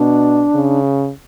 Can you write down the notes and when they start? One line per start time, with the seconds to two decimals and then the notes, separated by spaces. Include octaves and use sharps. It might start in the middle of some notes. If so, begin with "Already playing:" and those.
Already playing: B2 D4
0.55 C#3